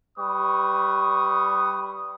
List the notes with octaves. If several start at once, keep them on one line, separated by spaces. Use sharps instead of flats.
G3 B4 C#6 D#6